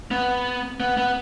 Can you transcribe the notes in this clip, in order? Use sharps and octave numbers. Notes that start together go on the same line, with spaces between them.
B3
B3
B3